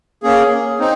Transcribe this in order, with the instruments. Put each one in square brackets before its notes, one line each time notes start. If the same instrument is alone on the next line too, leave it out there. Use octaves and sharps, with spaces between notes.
[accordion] A#3 C#4 G#4
C4 D#4